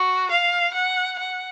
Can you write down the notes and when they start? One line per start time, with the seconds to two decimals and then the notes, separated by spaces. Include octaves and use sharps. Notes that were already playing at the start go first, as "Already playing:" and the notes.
Already playing: F#4
0.31 F5
0.74 F#5
1.18 F#5